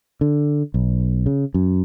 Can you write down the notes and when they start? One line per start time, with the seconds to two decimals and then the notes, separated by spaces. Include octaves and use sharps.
0.21 D3
0.74 B1
1.26 C#3
1.54 F#2